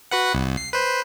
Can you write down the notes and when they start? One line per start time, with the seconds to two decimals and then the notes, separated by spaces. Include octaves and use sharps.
0.12 F#4 B4 F#5
0.34 C2
0.57 C7
0.73 B4 C5